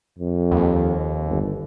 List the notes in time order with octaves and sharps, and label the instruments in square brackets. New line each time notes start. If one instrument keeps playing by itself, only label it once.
[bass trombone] F2
[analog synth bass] D#2
[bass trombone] G1